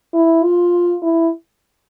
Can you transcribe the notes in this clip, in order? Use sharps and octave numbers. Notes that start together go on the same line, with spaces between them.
E4
F4
E4